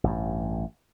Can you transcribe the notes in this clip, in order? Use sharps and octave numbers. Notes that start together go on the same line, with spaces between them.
A1 G2